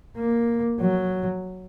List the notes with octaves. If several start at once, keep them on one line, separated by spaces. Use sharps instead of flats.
A#3
F#3